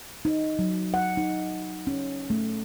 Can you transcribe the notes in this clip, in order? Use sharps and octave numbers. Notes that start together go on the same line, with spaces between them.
D#4
F#3
F#5
D#4
C#4
A3